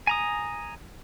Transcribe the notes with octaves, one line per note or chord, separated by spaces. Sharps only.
G#5 A#5 D#6